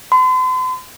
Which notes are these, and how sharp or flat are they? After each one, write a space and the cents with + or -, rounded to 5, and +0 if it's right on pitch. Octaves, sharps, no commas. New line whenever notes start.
C6 -45